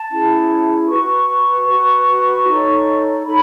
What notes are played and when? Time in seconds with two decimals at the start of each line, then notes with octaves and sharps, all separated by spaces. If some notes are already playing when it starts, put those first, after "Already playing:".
Already playing: A5
0.11 C#4 E4 G#4
0.89 F#4 B4 C#6
1.69 F#4 B4
2.47 D#4 A4 C#5
3.26 D#4 A4 C#5 B5